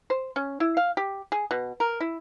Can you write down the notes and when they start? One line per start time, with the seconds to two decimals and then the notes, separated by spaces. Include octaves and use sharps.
0.10 C5
0.36 C#4
0.60 E4
0.77 F5
0.97 G4
1.32 G#4
1.51 B2
1.80 A#4
2.00 E4